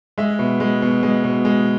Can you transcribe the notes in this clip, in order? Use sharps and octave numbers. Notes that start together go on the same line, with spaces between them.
G#3 E5
B2
G#3
B2
G#3
B2
G#3